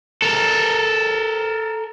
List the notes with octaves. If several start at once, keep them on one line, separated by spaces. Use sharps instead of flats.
A4 A#4